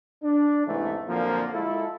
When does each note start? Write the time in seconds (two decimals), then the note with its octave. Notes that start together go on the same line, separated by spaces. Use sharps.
0.24 D4
0.67 E2 G#2 C3 E3 G#3 A3
1.09 F2 A#2 D3 F3 F#3 A#3
1.54 G#3 E4 F4 A4